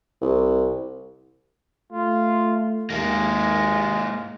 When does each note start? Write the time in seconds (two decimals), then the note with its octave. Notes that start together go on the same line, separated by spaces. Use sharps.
0.22 C2
1.92 A3 F4
2.90 D#2 G#2 G#3 A#3